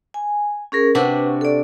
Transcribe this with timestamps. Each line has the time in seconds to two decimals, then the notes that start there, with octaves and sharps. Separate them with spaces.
0.14 G#5
0.72 C#4 G#4 A#4
0.95 C3 D4 F#4 B4 F#5
1.41 A4 D5